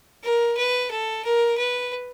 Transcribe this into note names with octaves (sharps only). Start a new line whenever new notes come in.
A#4
B4
A4
A#4
B4